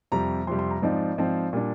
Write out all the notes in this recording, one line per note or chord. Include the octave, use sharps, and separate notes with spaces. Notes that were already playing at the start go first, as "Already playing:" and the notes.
F2 C3 G3 A#5
F2 C3 G3 C6
C6
A#5
G#2 F3 C4 D#4 D5
G#2 F3 C4 D#4
A#2 G3 D4